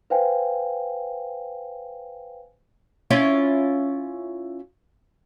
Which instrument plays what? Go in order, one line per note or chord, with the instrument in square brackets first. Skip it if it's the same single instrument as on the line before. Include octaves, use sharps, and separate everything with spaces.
[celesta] B4 C5 F5 G5 G#5
[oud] C#4 E4 F4